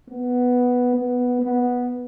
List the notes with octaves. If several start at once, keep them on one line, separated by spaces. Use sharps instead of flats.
B3
B3
B3